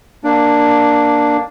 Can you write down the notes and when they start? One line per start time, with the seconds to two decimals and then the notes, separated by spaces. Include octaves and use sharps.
0.24 A#3 D4